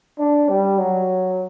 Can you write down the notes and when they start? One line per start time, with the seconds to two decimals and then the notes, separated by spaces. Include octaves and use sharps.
0.19 D4
0.49 G3
0.79 F#3